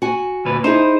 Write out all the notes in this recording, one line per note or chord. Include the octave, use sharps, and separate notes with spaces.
F#4 G#5
D2 A#2 B4
D#4 E4 G#4 C5